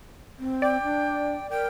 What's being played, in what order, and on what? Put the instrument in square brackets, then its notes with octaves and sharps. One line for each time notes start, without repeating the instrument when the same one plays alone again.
[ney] C4
[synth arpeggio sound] D5 [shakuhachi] G5
[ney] D4
[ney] A#4 [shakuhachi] G5